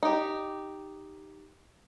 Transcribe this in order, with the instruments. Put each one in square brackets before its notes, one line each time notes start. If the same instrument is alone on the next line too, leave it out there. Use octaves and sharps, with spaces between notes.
[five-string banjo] D#4 G4